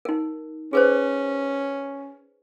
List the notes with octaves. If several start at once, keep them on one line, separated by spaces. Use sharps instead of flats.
D#4 A#4
C#4 G#4 B4 C5